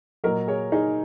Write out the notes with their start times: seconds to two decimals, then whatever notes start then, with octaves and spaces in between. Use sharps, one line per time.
0.24 A#2 F#3 A#4 D#5
0.48 G#4 C#5
0.72 D#4 G#4